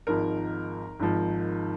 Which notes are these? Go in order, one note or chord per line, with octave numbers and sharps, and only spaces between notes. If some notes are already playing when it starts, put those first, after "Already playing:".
G#1 G#2 F3 A#4
G#1 G#2 F3